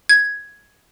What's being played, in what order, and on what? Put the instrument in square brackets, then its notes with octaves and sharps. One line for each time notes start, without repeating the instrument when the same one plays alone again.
[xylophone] G#6